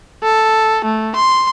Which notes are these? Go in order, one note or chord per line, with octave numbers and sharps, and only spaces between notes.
A4
A3
C6